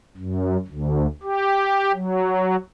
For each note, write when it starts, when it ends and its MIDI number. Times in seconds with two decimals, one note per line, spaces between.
0.17 0.57 42
0.68 1.06 38
1.23 1.92 67
1.93 2.56 54